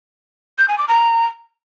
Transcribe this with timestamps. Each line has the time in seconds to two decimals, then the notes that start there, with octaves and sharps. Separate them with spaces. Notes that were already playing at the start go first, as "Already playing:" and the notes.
0.58 G6
0.68 G#5
0.78 D6
0.88 A#5